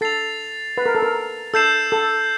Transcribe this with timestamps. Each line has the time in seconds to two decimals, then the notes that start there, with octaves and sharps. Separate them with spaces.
0.01 A4 A6 C7 F7
0.77 B4
0.86 A#4
0.95 A4
1.02 A#4
1.54 A4 E6 G6 C7 E7
1.92 A4